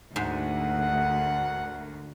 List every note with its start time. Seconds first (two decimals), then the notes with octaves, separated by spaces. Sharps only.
0.16 D2 G#2 A#4 F#5